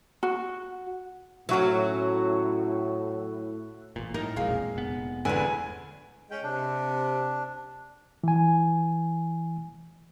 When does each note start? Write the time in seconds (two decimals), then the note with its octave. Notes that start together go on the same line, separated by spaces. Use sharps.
0.23 F#4
1.49 A2 F#3 C#4 F#4 E5
3.96 A1 A#2
4.14 A2 D#4 A#4
4.36 E1 A#1 F2 A#2 G#3 F5
4.76 F1 B3
5.25 E1 E2 D3 E4 B4 G#5
6.30 G#3 C#4 G5
6.43 C3 D4
8.24 E3 G#5